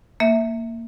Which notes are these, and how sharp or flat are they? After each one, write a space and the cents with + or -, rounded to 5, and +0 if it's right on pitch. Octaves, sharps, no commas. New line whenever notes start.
A#3 -15 E5 -10